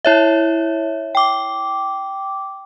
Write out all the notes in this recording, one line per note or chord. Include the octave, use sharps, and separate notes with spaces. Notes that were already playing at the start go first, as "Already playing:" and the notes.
E4 C#5 E5
G5 D6